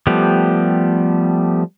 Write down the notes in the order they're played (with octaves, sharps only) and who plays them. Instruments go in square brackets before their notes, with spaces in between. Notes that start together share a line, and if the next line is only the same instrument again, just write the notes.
[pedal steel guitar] F3 G3 A3 B3 G4